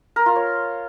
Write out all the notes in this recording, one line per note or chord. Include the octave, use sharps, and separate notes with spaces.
A#4
F4
C#5